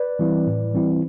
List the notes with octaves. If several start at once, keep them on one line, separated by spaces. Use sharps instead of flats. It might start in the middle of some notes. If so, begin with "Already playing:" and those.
Already playing: B4 D5
E3 G3 C4 E4
A2
E3 G3 C4 E4